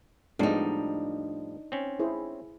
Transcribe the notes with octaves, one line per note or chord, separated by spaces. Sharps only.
A2 F3 G3 G#3 B3 D4 D#4
C4 C#4
E4 G#4 C5